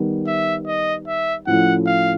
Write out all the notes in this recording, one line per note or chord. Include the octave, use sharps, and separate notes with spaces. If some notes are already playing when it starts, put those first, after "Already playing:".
Already playing: D#3 G3 B3
E5
D#5
E5
A2 F3 A3 C#4 E4 F#5
F5